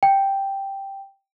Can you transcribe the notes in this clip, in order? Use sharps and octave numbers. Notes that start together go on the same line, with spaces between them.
G5